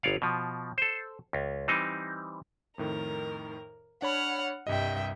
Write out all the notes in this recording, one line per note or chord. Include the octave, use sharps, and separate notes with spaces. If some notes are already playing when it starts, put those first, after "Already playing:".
G1 C#5 D5 F5
B2 F3
A4 C5
C#2
E3 G3 C4 D#4
F2 A2 D#3 A#4
D4 C#5 F#5 B5 F6
C2 G2 G3 D#5 E5 G5